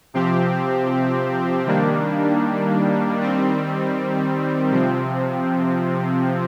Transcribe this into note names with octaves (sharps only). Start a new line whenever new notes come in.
C3 F3 C4 G4
D#3 G3 A#3 D4
D#3 G3 C4
C3 F3 C4